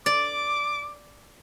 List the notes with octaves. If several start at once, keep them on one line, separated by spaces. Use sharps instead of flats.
D5 D6